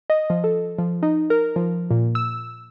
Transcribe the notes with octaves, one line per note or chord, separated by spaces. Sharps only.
D#5
F3
A4
F3
D#4
A#4
F3
A#2
E6